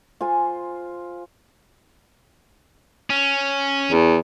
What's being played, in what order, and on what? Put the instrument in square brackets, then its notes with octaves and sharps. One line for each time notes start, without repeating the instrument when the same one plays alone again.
[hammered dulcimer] F4 C5 G#5
[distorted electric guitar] C#4
[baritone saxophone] E2